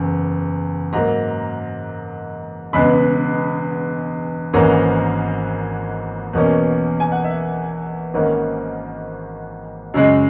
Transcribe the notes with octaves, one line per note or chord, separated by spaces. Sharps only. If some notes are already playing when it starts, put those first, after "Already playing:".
Already playing: F#1 E2
G#2 F#3 A#3 A#5
E1 E2 C#3 G#3 B3 B5
G#1 G#2 E3 A#3 C#4 A#5
E2 B2 A#3 C#4
G#5
F#5
E5
G#1 G#2 D#3 A#3 C#4
F#2 C#3 G#3